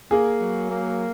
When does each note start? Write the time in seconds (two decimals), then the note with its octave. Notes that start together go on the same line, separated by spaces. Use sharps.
0.11 A#3 G#4
0.41 F#3
0.70 A#3